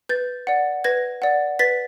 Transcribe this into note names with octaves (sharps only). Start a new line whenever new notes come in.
B4 G6 A6
D5 F#5
B4 G#6 A#6
D5 F#5
B4 A6 B6